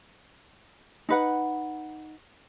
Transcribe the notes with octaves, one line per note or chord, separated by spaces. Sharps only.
D#4 B4 F#5